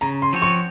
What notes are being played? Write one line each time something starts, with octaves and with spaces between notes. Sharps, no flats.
C#3 A#5
C6
F3 C4 F#4 C#5
C#6